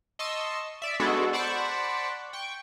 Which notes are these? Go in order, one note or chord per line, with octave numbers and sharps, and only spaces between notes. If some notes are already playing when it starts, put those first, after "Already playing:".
D#5 A5 C6 C#6 E6
D5 E5
G#3 B3 D4 F#4 G#4 A4
C5 D5 F#5 A5 B5 C#6
G5 C#6